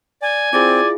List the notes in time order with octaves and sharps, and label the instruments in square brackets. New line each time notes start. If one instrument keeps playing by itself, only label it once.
[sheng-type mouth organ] D5 [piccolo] G#5
[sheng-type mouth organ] C4 [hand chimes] E4 F4 G#4 [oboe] D5